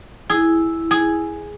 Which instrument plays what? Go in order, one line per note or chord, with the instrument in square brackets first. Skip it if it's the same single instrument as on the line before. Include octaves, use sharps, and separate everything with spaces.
[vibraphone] E4 [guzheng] G#4
[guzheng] G#4